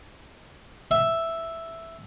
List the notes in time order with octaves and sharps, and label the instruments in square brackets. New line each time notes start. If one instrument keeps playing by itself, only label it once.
[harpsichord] E5